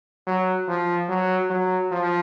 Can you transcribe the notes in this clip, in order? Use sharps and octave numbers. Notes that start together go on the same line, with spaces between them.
F#3
F3
F#3
F#3
F3